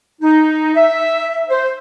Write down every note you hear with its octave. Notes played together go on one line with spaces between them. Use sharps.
D#4
E5
C5